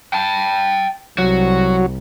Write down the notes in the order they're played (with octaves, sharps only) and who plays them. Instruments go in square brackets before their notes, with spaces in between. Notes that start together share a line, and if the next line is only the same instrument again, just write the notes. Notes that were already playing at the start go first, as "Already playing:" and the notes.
[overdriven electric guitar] G5 A5
[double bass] C2 [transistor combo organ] F#3 [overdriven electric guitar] F#4